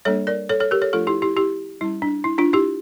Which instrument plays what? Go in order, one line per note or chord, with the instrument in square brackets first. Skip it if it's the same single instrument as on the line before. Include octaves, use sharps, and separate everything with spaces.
[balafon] G3 A#3 D4 A4 C#5
A#4 D5
A4 C#5
A4 C#5
G4 A#4
A4 C#5
F3 A3 D4 F4 A4
E4 G4
E4 G4
E4 G4
G3 C#4 E4
D4
E4
D4 F4
E4 G4